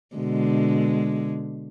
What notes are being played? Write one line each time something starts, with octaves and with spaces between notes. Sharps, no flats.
B2 D3 G#3